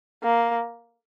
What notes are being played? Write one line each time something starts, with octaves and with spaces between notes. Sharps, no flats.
A#3